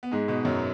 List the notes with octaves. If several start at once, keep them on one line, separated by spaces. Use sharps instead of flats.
B3
G#2 G#3
B2 B3
F#2 F#3